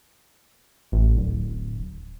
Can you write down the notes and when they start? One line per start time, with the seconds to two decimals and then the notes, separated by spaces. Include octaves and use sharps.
0.92 A1
1.17 D1